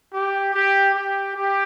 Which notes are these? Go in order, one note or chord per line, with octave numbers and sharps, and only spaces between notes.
G4
G4
G4
G4